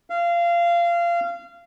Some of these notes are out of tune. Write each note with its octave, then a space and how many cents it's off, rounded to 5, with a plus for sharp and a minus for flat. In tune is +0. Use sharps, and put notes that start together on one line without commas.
F5 -25